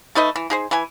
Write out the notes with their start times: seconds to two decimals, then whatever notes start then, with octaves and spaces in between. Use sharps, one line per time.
0.15 A3 D#4 B4 D#5
0.36 E3
0.50 D#4 G#4 C5
0.71 E3 B4 G#5